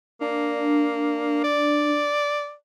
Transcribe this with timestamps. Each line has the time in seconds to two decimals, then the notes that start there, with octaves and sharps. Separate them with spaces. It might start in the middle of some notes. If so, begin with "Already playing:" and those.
0.21 A#3 D4
1.44 D5